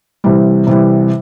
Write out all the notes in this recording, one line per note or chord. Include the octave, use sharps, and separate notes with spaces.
C3 E3 G3
C3 E3 G3